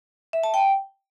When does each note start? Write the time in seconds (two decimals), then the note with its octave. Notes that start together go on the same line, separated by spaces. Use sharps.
0.33 E5
0.43 A5
0.54 G5